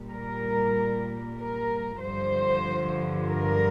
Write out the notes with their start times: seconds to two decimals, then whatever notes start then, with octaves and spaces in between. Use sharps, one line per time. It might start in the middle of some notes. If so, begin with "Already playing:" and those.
Already playing: A#2 G3
0.10 A#4
1.37 A#4
2.01 G2 D3 F3 C5
3.29 A#4